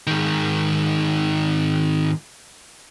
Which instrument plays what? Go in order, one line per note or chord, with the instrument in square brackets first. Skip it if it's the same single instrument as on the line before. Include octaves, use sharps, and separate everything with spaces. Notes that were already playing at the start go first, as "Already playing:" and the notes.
[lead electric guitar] G#2 D#3